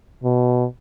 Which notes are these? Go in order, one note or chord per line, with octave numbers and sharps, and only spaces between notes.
B2